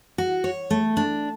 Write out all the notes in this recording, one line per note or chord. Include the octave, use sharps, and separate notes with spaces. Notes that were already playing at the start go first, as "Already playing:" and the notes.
F#4
C#5
A3
D4